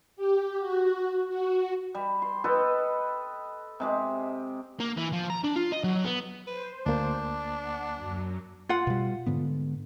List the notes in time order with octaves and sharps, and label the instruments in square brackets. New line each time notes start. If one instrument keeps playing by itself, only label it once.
[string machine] G4
F#4
F#4
[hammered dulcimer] G3
C6
A4 B4 D#5 G5
C3 G#3 G4
[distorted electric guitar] A#3
E3
F3
A#5
D4
F4
D#5
F#3
B3
[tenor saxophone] B4 [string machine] C5
[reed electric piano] D2 A#3 [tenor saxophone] D4
[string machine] F#5
F#2 F#3
[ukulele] F4 F#5
[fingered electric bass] B2 G3
G#2 D3 B3